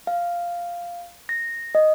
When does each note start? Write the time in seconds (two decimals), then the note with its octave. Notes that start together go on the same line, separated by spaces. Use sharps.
0.07 F5
1.29 A#6
1.75 D#5